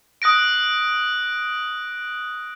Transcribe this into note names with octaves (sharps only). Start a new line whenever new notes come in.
D#6 F#6 A#6 D7